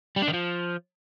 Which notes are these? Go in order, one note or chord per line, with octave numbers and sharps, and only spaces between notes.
G3
D4
D#3
F3